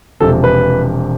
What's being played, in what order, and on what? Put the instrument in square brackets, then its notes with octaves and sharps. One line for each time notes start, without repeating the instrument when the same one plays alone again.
[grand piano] E1 E2 C3 F3 A4
B4